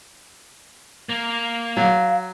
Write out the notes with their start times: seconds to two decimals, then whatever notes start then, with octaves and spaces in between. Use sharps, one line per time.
1.09 A#3
1.77 F#3 F5